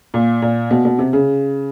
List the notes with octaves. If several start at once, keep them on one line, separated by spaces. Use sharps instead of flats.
A#2
A#2
B2
B2
C3
C#3